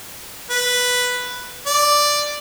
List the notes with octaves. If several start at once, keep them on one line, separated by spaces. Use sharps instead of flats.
B4
D5